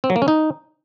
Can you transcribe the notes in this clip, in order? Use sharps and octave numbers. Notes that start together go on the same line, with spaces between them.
C4
F#3
A#3
C#4
D#4